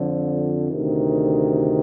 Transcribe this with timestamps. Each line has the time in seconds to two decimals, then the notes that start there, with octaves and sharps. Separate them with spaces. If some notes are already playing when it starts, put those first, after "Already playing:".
Already playing: F2 D3 F3
0.69 D2 C3 D#3